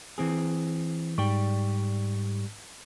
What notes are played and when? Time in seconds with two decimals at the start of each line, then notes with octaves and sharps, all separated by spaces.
0.18 E3 C4 G#4
1.18 G#2 G3 D5 G5 C#6